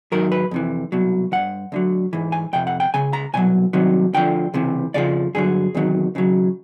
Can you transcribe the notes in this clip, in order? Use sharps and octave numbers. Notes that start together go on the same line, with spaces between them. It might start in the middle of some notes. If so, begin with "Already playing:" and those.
G#2 D#3 F#3 A#4
B4
F2 C3 E3
C2 B2 F#3
G2 E3 F#5
D2 D3 F#3
G#2 E3
G#5
F2 C3 G5
F#5
G5
C#2 C#3 G#5
A#5
C2 B2 F#3 G#5
C2 C3 D#3 F#3
D2 D3 F3 G5
C#2 C3 E3
F2 C#3 F3 D5
G2 D3 F#3 G#4
E2 C3 D#3 F#3
D#2 C#3 F#3